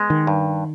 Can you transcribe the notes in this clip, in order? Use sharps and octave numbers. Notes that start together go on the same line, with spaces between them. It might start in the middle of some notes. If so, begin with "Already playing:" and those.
Already playing: G#3 B3
D#3
G2